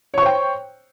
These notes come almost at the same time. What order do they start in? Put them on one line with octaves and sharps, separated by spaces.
C#5 C#6 C5 G5